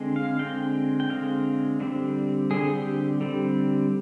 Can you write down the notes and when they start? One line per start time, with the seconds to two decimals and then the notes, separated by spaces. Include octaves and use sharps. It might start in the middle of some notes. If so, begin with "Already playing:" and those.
Already playing: D3 G#3 C4
0.16 F5
0.39 D3 G#3 C4 G5
1.00 G5
1.10 D3 G#3 C4 F5
1.80 D3 G3 C4
2.51 D3 G3 C4 G#4
2.74 G4
3.21 D3 G3 C4